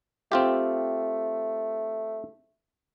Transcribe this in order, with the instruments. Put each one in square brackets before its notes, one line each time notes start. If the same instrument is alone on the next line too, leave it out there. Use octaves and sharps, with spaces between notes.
[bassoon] A3 [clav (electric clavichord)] C4 F4 G4